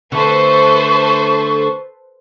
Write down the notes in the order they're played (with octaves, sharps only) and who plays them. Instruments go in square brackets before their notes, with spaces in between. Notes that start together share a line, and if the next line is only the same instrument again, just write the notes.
[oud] D3 A3 [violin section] A4 B4 C5 [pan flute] C#6